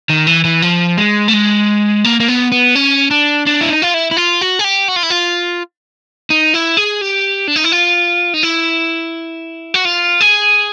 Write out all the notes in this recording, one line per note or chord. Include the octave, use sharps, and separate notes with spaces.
D#3
E3
E3
F3
G#3
A3
G#3
A#3
A#3
B3
B3
C#4
D4
D4
E4
D#4
F4
E4
E4
F4
F#4
G#4
G4
F#4
F4
E4
F4
D#4
E4
G#4
G4
D4
D#4
E4
F4
D#4
E4
F#4
F4
G#4